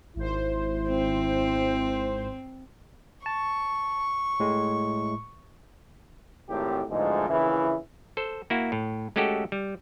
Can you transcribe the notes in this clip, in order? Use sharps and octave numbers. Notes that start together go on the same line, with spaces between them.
G#1 E4 C5
C4
A5 C#6
A2 G#3
G#1 A2 G4
G#1 D2 G#2 E3 F3 G#3
A#1 C#3 E3 E4
A4 C5
A#3 E4 F#4
A2
G#3 A3 C#4 F#4 G4 A4
G3